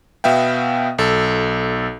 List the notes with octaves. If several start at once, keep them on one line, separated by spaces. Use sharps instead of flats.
B2 B3 E5 F5 G5
B1 A4